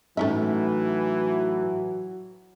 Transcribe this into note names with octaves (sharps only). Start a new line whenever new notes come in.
A2 E3 F#3 A3 C#4 D#4 E5